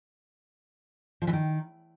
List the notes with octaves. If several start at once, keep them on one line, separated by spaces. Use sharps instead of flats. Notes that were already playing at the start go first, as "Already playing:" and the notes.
F3
E3
D#3